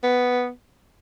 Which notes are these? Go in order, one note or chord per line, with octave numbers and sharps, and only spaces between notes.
B3